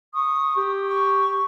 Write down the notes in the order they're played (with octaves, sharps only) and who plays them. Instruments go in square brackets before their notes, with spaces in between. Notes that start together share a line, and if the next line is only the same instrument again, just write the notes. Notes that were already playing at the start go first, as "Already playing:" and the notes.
[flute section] C#6 D#6
[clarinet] G4
[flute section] C#6